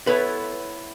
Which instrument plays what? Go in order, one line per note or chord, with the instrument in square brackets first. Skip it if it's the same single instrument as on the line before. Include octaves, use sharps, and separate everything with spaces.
[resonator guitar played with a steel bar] B3 E4 A4 C#5 [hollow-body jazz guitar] B4